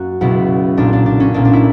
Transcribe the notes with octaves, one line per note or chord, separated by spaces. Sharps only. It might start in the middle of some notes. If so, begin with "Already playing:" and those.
Already playing: F#2 A#3 F#4
C#2 B2 F#3 E4
B1 A#2 A#3 D4
D4
D4
C#4
B1 A#2 A#3 D4
D4
E4